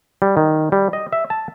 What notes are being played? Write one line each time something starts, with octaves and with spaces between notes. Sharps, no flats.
G3
D#3
G3
D#5
E5
A5